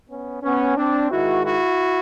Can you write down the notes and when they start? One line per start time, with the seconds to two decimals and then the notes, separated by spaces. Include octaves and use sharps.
0.09 B3 C#4
0.43 B3 C#4
0.77 C4 D4
1.10 G#2 D#3 G#3 E4 F#4
1.44 E4 F#4